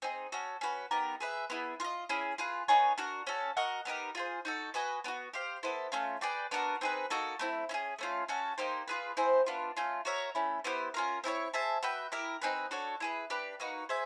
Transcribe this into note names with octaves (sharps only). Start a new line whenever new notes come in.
C4 D#4 G#4
C#4 F#4 A4
C#4 F#4 B4
B3 D#4 G4 A#4
G#4 B4 E5
B3 E4 G#4
F4 A#4 D#5
C#4 E4 G#4
F4 G#4 B4
B3 D#4 G#4 C#5
D4 F#4 A#4
C#4 F#4 A4
F#4 A#4 D#5 F#5
B3 D#4 G4 A#4
F4 G#4 C5
D#4 F#4 A4
F#4 B4 D#5 G#5
B3 D4 F#4
G4 C5 F5
B3 E4 A4 C5
A3 C#4 F4
G#4 B4 D5 G5
B3 D4 F#4 A#4
C4 D#4 G#4 B4
A#3 D#4 F#4 A4
A3 C4 E4
C#4 E4 G#4
A3 C#4 F4
C#4 F#4 A4
A#3 D#4 G4 C5
F4 G#4 B4
C4 E4 G#4 C5
B3 D4 F4
A3 C#4 F4
F#4 A#4 C#5 E5
A3 C#4 E4
B3 E4 G4 C5
C#4 F4 A#4
C4 E4 A4 C#5
G#4 C5 E5 A5
F#4 B4 E5 G5
E4 G4 A#4
C4 D#4 G#4 B4
D4 F#4 A4 C#5
E4 G#4 B4
D4 G4 B4
A#3 D#4 F#4 B4
G#4 C5 E5 G#5